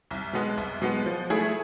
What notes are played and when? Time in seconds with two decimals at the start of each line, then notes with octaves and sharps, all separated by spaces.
0.11 C2
0.33 B2 G#3 B3
0.57 C2
0.82 B2 G#3 B3
1.06 F3
1.30 A3 E4 G#4